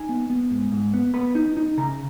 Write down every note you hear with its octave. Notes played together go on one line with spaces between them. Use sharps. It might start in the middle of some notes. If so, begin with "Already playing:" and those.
Already playing: D#4 G#5
B3
B3
G#2
G#2
B3
B3 B5
D#4
D#4
C#3 A#5